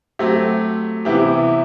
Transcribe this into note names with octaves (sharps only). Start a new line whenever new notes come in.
F#3 A3 C4 G4
C3 E3 B3 E4 G4